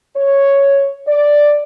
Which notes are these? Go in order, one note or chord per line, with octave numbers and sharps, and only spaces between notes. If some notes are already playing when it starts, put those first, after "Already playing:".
C#5
D5